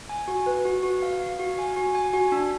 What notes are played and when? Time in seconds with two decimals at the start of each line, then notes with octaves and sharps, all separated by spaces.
0.09 G#5
0.28 F#4
0.46 B4
0.65 F#4
0.83 F#4
1.02 F5
1.20 F5
1.39 F#4
1.59 G#5
1.76 F#4
1.95 G#5
2.13 F#4
2.32 D4